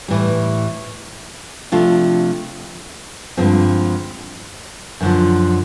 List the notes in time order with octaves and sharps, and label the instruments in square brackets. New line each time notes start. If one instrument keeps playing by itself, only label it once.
[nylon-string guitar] A2 E3 G3
C3 F3 A3 D4 F4
G2 D3 F3 G#3 C4
F#2 D3 F3